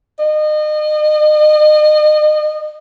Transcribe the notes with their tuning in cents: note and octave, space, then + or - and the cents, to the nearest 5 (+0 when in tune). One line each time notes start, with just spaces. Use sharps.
D#5 -35